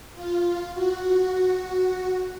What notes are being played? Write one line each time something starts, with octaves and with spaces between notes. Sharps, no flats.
F4
F#4